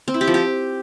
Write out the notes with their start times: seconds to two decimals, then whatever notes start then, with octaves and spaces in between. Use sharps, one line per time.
0.08 C4
0.14 E4
0.21 G4
0.27 F3
0.34 G4